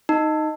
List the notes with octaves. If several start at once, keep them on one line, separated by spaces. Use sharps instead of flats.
D#4